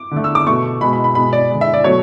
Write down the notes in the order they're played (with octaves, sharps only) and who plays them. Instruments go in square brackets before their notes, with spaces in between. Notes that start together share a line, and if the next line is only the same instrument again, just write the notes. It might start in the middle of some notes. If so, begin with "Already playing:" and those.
Already playing: [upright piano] D6
D3 A3
E6
D6
B2 A3 C#6
B2 G#3 B5
B5
B5
B2 G#3 B5
D5
D3 G#3
E5
D5
B2 F#3 A3 C#5